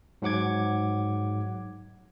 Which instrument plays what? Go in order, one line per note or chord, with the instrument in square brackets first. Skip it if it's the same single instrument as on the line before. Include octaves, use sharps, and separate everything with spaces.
[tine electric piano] G#2 F#3 F#5 D6 G#6